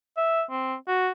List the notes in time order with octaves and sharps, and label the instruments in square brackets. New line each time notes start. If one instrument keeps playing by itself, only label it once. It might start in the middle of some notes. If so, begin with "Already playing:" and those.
[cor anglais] E5
C4
F#4